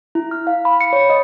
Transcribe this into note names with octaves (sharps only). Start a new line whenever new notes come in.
E4
F6
F5
B5
C#7
C#5
D#5